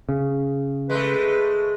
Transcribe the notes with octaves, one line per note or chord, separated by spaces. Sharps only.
C#3
G#3 A3 B4